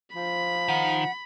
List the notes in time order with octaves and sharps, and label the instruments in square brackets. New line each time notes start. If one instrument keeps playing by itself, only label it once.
[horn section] F3 [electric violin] B5
[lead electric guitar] D#3 [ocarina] F#5